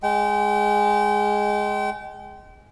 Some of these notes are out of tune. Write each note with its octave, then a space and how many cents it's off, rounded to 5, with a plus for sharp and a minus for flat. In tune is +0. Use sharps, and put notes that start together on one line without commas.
G#3 +0 G5 -35